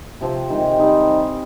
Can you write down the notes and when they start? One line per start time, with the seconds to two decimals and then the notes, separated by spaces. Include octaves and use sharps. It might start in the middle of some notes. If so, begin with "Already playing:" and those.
0.21 C3 F3 C4
0.49 C3 D#3 G#3
0.79 G3 C4 D#4